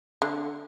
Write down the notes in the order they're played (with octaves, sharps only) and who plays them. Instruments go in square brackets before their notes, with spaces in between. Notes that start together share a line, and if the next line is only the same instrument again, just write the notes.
[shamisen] D3